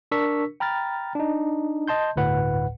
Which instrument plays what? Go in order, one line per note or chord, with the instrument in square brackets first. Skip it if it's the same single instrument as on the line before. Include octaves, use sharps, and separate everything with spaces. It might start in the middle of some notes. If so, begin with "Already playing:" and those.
[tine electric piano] D4 A#4 C#6 E6 B6
G5 A#5 B5 F6 A6
D4 D#4
D#5 A5 C6 G6
G1 D2 A2 B4 F#5